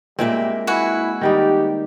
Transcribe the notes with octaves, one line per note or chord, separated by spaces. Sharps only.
A#2 G3 G#3 A#3 C4 E5
E4 F#4 B4 G#5
D#3 G3 D#4 G4